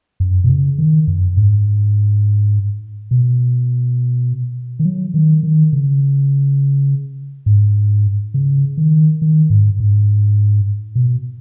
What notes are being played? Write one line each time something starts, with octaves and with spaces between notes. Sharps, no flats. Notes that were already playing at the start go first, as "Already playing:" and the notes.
F#2
B2
C#3
D#3
F#2
G#2
B2
D#3
F#3
D#3
D#3
C#3
G#2
C#3
D#3
D#3
G#2
G#2
B2